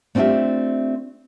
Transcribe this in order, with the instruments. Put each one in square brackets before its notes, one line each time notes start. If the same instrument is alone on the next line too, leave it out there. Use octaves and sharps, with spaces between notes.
[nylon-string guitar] A3 C4 D4 F4 G4 E5